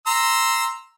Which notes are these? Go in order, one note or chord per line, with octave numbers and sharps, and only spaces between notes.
A#5 C6 E6